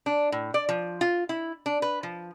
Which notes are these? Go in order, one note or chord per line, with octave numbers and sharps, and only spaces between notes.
D4
A2
D5
F3
F4
E4
D4
B4
F3